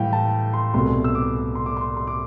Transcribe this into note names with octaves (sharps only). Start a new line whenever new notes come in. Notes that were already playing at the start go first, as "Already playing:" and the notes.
Already playing: A2 E3 G3 F5 G5
A5
C6
C2 B2 A3 C6
E6
D6
C6
D6
C6
C6
D6